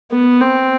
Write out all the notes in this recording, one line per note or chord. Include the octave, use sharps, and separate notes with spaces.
B3
C4